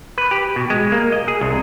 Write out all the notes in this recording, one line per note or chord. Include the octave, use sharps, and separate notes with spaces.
B4
G4
B2
G#3
A#3
D#5
G#4
C2